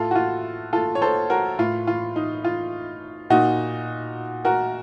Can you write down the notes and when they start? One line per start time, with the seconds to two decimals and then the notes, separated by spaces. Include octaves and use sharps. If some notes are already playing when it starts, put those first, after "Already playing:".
Already playing: A2 F4 A4
0.11 F#4
0.15 F4
0.73 F4 A4
0.95 C#5
1.02 A4 C5
1.30 F#4 A#4
1.59 A2 F4
1.87 F4
2.16 D#4
2.44 F4
3.30 A#2 D#4 F#4
4.45 F#4 A#4